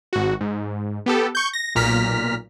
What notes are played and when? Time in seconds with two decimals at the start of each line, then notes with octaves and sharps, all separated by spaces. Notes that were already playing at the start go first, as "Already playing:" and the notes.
0.13 G#1 F#4
0.40 G#2
1.06 B3 G4 A4
1.35 C#6 G6
1.53 A#6
1.75 B1 A#2 A#5 F6 B6